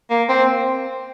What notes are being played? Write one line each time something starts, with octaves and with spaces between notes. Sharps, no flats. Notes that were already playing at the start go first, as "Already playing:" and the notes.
A#3
C4